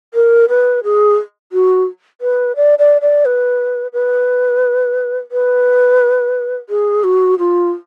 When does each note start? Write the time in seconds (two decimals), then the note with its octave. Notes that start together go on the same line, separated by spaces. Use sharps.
0.14 A#4
0.49 B4
0.84 G#4
1.52 F#4
2.21 B4
2.56 D5
2.79 D5
3.02 D5
3.25 B4
3.93 B4
5.32 B4
6.69 G#4
7.04 F#4
7.39 F4